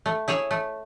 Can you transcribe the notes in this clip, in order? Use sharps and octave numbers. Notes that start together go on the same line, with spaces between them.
A3
E4 G#4 C#5 E5
A3